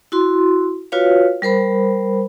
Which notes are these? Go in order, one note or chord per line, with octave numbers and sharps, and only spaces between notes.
E4 F#4 C6
F4 F#4 B4 C#5 F5
G3 A#4 C5 B5